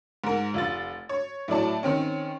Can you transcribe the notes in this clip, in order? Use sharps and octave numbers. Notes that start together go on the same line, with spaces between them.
G#2 A#4
F1 F4 A6
C#5
A2 F#3 D5 A5
D#3 C4 C#4